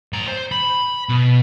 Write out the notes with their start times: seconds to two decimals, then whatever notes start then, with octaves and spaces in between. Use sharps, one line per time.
0.13 A2 A#5
0.28 C5
0.52 B5
1.09 B2